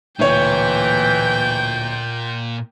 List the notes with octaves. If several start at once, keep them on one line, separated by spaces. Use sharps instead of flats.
D1 A#2 E3 C#5 G5 G6